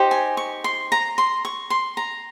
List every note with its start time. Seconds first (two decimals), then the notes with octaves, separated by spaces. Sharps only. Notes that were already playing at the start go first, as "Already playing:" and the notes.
Already playing: D#4 G4 C5
0.11 G#5
0.37 C#6
0.64 C6
0.92 A#5
1.18 C6
1.45 C#6
1.70 C6
1.97 A#5